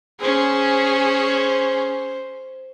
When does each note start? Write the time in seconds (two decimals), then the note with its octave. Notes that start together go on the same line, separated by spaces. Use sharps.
0.20 C#4 G#4 C5